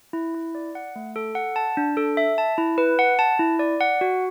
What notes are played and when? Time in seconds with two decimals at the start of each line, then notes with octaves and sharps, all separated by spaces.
0.13 E4
0.35 E4
0.55 D5
0.75 F#5
0.96 A3
1.16 A4
1.35 F#5
1.56 A5
1.77 D4
1.97 A4
2.17 E5
2.38 A5
2.58 E4
2.78 B4
2.99 F#5
3.19 A5
3.39 E4
3.59 D5
3.81 F#5
4.01 F#4